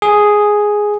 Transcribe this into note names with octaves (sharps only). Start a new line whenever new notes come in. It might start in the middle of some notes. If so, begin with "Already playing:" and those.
G#4